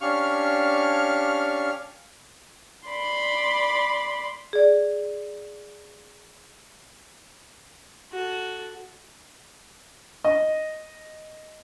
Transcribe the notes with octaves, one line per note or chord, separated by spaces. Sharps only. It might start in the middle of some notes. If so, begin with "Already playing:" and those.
C#4 D4 G4 F5 C#6 F6
D5 B5 C6
G#4 D5
F#4 A4
D#5